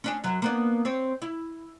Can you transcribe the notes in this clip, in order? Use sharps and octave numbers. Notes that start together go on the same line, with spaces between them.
C#4 D4 G#4
F#2 F#3
A#3 B3 D4
C4 C#5
E4